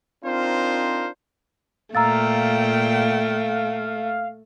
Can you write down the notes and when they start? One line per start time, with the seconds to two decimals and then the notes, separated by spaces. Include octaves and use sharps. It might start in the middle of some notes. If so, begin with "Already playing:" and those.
0.25 C4 D4 D#4 F4 A#4 C5
1.95 A#2 A3 F5 G5 A#5 E6 A6